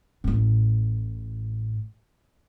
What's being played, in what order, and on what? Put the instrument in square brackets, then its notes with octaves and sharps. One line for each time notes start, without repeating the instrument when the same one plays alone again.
[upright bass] A1 A2